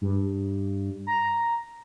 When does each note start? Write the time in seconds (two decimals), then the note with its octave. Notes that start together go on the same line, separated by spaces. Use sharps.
0.01 G2
1.07 A#5